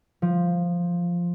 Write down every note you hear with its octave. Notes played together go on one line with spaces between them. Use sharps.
F3